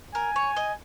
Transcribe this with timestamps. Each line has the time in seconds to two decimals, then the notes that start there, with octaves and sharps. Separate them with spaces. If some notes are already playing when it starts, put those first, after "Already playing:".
0.15 A#4 G#5
0.36 C#5
0.56 D#5